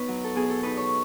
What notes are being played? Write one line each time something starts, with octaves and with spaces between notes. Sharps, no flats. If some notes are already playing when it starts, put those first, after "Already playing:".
Already playing: B3 D#4 B4 C#5
F#3
A4
B2 G#4
A4
D#4 B4
C#5